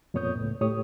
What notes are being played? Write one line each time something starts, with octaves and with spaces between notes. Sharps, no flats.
F2 A#2 B3 C#5 D#6 G6
C#2 A2
A2 G4 C#5 D#6